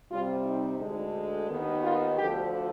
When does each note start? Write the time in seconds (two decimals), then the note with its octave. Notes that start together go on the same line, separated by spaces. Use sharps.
0.10 C3 G3 C4 F4
0.44 D#4
0.80 D2 D3 G#3
1.49 D#2 D#3 B3 D#4
1.83 F4
2.18 D2 D3 F3 G4